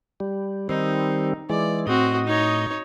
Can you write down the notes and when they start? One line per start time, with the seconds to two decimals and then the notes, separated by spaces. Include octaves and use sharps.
0.20 G3
0.69 D#3 G3 C4 D#4
1.50 E3 G#3 D5
1.87 A2 C4 F#4 D#5
2.27 D#4 C#5